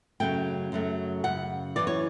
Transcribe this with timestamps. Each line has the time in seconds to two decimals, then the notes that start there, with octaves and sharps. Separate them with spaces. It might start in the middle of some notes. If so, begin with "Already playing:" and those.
0.20 F#2 C#3 F#3 A3 G5
0.72 F#2 C#3 F#3 A3
1.24 F#2 C#3 F#5
1.76 F#2 C#3 E3 D5
1.87 C#5